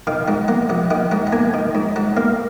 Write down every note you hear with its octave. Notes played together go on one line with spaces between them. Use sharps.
D#3 F5
G#2 F#5
A#3 F#5
A#1 F#5
D#3 F#5
G#2 F#5
F#5
A#3 G#5
D#3
G#2
G#2 F#5
A#3 F5